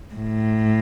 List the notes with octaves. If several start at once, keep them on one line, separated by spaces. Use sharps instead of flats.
A2